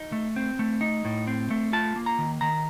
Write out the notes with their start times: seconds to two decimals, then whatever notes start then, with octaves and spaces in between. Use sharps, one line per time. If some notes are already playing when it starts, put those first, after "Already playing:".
Already playing: D#4
0.12 A3
0.36 C4
0.59 A3
0.81 D#4
1.05 A2
1.27 C4
1.50 A3
1.73 F4 A5
1.96 A#3
2.06 A#5
2.18 D#3
2.41 D#3 A#5